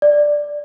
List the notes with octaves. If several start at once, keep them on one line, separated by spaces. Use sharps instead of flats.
D5